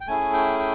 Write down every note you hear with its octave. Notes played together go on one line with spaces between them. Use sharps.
G5
A3 C#4 E4 G#4 G#5
G5
G5